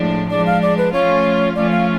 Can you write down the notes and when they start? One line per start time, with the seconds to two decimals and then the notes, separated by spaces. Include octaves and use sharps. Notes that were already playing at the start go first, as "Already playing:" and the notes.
Already playing: A2 F3 G#3 D4
0.30 F3 G#3 D4 D5
0.46 F5
0.62 D5
0.77 B4
0.93 F3 A3 C#4 F4 C#5
1.55 F3 A3 C#4 F4 D5
1.71 F5